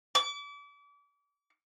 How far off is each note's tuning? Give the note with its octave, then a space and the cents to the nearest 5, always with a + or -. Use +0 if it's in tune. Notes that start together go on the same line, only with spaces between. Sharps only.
D6 -35